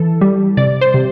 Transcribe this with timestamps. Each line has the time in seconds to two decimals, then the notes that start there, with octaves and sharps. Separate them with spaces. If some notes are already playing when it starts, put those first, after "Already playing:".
Already playing: E3 A4
0.21 G3
0.57 C3 D5
0.81 C5
0.94 C3